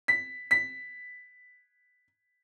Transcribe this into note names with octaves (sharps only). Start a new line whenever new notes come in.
B6
B6